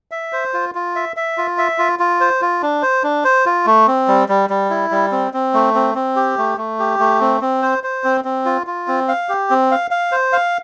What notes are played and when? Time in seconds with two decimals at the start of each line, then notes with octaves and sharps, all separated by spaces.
0.11 E5
0.33 C5
0.54 F4
0.75 F4
0.96 E5
1.17 E5
1.38 F4
1.58 E5
1.78 F4
1.99 F4
2.21 C5
2.41 F4
2.62 D4
2.82 C5
3.03 D4
3.24 C5
3.46 F4
3.66 A3
3.87 C4
4.08 G3
4.29 G3
4.50 G3
4.70 E4
4.91 G3
5.12 C4
5.34 C4
5.54 A3
5.75 C4
5.95 C4
6.16 G4
6.38 A3
6.58 A3
6.79 G4
6.99 A3
7.20 C4
7.41 C4
7.62 C5
7.84 C5
8.04 C4
8.25 C4
8.45 F4
8.67 F4
8.88 C4
9.08 F5
9.29 G4
9.50 C4
9.71 F5
9.91 F5
10.12 C5
10.33 F5